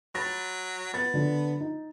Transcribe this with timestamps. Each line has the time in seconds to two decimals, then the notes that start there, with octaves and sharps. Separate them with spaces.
0.15 F#3 B5 A6 A#6
0.94 B3 A6
1.14 D3 F#3 D4
1.61 D#4